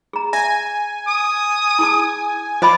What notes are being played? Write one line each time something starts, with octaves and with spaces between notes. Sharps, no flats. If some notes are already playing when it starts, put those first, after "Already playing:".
G#4 A#5
E5 G#5
D#6
E4 G#4 A5
F3 C5 D#5 B5 D6